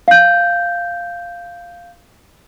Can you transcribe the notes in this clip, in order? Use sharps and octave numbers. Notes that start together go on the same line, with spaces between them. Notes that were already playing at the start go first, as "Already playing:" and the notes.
F5 G6